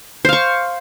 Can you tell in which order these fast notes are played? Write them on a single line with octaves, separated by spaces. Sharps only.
C5 F5 C#6